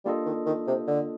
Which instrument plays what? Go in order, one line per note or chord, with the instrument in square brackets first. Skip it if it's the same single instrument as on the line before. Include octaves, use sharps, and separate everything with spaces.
[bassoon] G3 [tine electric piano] A#3 D4 F4 A4 D#5
[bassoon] D#3
D#3
C3
D3